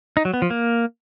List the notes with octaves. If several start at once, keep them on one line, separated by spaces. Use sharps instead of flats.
D#4
F#3
B3
F3
A#3